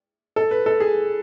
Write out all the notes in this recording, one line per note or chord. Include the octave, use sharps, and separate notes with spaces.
A4
B4
A4
G#4